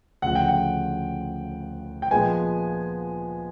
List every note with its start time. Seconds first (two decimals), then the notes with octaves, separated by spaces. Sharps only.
0.22 D2 C#3 F3 F#5
0.35 G5
0.48 F#5
2.02 G5
2.11 A#2 F3 G#3 B3 G#5